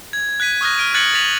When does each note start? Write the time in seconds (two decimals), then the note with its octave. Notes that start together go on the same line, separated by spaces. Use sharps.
0.13 G#6
0.40 F#6 G#6 B6 D#7
0.61 C#6 D#6 F6 F#6 A#6
0.78 F6 D7 D#7
0.94 F#6 G#6 A6 B6 C#7 F#7
1.14 A6 B6 F7 F#7